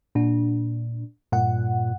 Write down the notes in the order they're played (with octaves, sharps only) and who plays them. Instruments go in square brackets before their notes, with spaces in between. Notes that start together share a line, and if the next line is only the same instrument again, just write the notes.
[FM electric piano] A#2 D4
[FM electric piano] G2 F#5 [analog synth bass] A#2